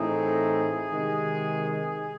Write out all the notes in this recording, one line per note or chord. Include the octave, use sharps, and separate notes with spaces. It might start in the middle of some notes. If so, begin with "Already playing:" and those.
Already playing: A2 E3 A3 C4 D#4 G#4
C3 D#3 G#3